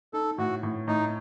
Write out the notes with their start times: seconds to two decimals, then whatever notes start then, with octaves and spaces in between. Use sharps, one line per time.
0.13 D#4 A4
0.38 A2 F#4
0.63 A2
0.88 A2 D#4